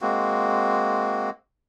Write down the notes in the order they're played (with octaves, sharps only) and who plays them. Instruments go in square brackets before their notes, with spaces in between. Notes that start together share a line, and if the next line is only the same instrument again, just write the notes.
[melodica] G#3 A#3 C4 F#4